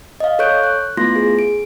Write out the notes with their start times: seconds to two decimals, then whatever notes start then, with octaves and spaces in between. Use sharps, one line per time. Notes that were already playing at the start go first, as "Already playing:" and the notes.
0.20 D#5 F5
0.39 A4 C#5 C#6 F#6 G6 D7
0.64 F#6
0.97 A3 B3 E4 F4 C6 A#6
1.16 G#4
1.39 D7